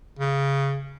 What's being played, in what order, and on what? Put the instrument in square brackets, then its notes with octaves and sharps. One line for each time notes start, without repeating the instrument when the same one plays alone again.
[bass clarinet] C#3